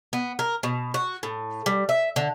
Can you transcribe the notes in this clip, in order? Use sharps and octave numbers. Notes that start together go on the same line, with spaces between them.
B3
A#4
B2
F#4
A2
G3
E5
D3